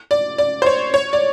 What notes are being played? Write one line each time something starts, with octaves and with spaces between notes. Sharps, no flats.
D5
D5
C5
C#5
C#5
D5